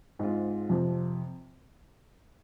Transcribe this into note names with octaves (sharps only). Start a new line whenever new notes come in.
G#2 G#3 C4 F4
F2 C3 F3